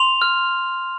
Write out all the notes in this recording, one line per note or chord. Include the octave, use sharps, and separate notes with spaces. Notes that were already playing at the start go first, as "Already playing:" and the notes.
Already playing: C6 F7
F6